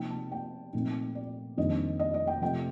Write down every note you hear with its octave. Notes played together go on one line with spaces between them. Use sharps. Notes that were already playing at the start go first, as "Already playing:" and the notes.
Already playing: C3 F3 A#3 D#4 G5
A5
G5
A#2 F3 A3 C4 D#4
D5
F2 D#3 G3 A#3 D4 D#5
D#5
D#5
G5
C3 F3 A3 G5